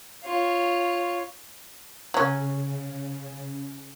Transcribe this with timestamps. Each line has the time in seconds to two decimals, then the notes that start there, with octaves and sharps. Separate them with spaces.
0.24 F4 C#5
2.14 C#3 F#3 C#4